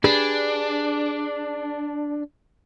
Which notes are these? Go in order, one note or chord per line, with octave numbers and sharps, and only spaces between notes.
D4 G4 G#4 B4